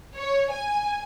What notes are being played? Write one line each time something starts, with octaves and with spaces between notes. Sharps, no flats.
C#5
G#5